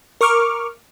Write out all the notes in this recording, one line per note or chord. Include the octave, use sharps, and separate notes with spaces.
A#4 C#6 D6 F6